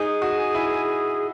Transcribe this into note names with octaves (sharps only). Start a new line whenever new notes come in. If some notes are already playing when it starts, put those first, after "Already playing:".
Already playing: D#4 G#4
F#4
E4